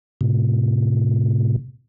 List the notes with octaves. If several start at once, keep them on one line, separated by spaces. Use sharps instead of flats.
A2 C3